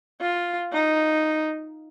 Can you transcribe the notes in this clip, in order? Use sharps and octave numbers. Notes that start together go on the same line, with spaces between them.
F4
D#4